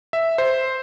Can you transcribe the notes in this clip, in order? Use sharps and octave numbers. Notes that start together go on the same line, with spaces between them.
E5
C5